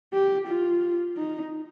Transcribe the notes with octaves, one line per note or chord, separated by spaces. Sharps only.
G4
F4
D#4